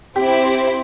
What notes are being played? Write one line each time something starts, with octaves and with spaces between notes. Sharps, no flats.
C4 E4 G4